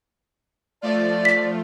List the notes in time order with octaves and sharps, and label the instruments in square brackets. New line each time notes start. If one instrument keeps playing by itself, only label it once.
[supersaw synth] F3 A3 F4 [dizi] D5
[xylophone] B6